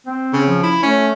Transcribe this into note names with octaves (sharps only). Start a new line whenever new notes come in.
C4
C#3
F3
E4
A3 C#4